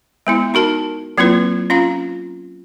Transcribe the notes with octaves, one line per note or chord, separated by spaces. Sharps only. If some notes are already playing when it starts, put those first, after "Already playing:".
G#3 B3 E4
D#4 F#4 A#4 A5
F#3 A#3 C4 E4 F4 B4
C#4 F4 F5 A#5